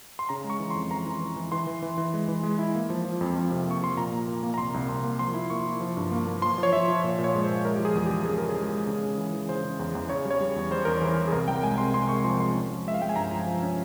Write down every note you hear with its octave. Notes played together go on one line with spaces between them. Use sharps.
C6
C#3 A#5
G#3
C#6
E3
F2 C6
E3 A#5
E3
E3
E3
E3 C6
E3
E3
E3
G#3
E3
G#3
E4
A#3
F3
F3
F2
F2
C3
A#3 C#6
F3 C6
A#2 A#5
A#3
A#3
A#3
A#5
C2 C6
C2
C2 C6
A#3
F3 C6
E4
A#3 C#6
E4
F3
G2
A#3
A#3
F3 C6
F3
C#5
F3 E5
F3
A#2 C#5
A#2
C#5
G#3
C5
A#2
G#3 A#4
F3 G4
G#4
E2
C#3 G4
G#3 G#4
C#3 A#4
G#4
G#3
G#3
C#3
C#3
E3
E3
C#3 C5
C#3
E2
E2
C#3 C#5
G3
C#5
G3
E2
G3 C5
E2 A#4
E3 C5
E3
G#4
C2 A#4
C2 G5
G#3 G#5
C3 C6
C3 C6
G#3 C#6
F3 C6
G#3 C6
C#4
F3
G#3 E5
F5
G#3 G5
G#5
G2 A#5
F3
F3
C#4